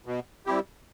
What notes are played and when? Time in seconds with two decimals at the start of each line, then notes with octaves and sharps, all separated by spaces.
0.06 B2
0.46 G3 C4 E4 G4